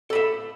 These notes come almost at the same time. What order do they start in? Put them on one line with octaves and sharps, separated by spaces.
A4 B5 E5